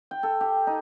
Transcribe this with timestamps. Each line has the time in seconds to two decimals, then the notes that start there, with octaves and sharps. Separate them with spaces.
0.11 G5
0.23 A4
0.41 G4
0.67 D#4